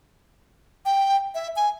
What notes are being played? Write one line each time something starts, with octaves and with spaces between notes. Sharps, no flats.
G5
E5
G#5